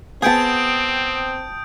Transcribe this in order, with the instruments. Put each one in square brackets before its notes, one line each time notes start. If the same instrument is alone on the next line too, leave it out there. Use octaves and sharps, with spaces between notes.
[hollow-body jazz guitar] B3 G#4 [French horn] C4 [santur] G5 A5 [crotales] D#6 G6 D7